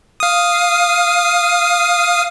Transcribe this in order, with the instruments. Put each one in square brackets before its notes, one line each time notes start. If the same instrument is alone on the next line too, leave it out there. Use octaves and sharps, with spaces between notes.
[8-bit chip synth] F5 D#6